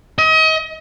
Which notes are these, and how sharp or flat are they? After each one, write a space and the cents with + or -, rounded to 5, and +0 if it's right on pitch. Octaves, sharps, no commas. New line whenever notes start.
D#5 +35